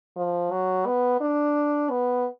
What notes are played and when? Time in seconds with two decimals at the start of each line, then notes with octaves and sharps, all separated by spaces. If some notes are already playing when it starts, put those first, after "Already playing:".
0.16 F3
0.51 F#3
0.86 B3
1.20 D4
1.90 B3